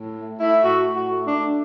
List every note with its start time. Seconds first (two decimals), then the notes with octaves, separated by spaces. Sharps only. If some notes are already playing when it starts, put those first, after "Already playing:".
Already playing: A2
0.16 A3
0.40 A3 E4
0.63 A2 F#4
0.87 A2
0.95 F#4
1.10 A3
1.26 D4
1.34 A3